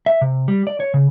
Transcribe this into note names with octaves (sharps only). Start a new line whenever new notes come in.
E5
C3
G3
D5
C#5
C#3